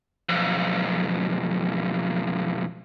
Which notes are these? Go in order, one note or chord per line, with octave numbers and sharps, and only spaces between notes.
B1 F2